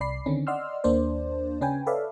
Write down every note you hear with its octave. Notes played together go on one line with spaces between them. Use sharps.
C2 D5 B5 C7
D3 D#3 C4 C#4
D5 D#5 F#5 C6 E6 F6
D#2 A#3 D4 C5 D5
C#3 C#4 B4 G5 G#5
A4 B4 C#5 D5 E5 F5